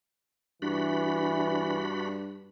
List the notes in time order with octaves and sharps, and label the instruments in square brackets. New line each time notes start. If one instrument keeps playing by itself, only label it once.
[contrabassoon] G2 [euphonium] E3 [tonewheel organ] D4 F#4 B5